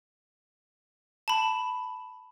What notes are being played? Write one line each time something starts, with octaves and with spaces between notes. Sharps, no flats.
A5 B5